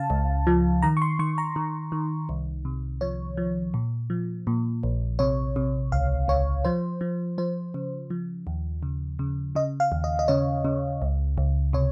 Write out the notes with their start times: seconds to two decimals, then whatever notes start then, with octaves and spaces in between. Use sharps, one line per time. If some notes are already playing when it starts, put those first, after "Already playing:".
Already playing: C#3 F5 A5
0.10 C#2
0.47 F3
0.83 D#3 A#5
0.97 C#6
1.02 C6
1.19 D#3 C#6
1.38 A#5
1.56 D#3
1.92 D#3
2.29 C2
2.65 C3
3.01 F3 C#5
3.37 F3
3.74 A#2
4.10 F3
4.47 A#2
4.83 A#1
5.19 C3 C#5
5.56 C3
5.92 C#2 F5
6.28 C#2 C#5
6.65 F3 C5
7.01 F3
7.38 F3 C5
7.74 C#3
8.10 F3
8.47 D#2
8.83 C#3
9.19 C#3
9.55 C#3 D#5
9.80 F5
9.92 D#2
10.04 D#5
10.19 D#5
10.28 C#3 C#5
10.65 C#3
11.02 C#2
11.38 C#2
11.73 C3 C#5